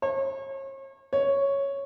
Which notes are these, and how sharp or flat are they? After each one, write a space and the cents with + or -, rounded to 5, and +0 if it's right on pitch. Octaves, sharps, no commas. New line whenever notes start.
C#5 -40
C#5 +0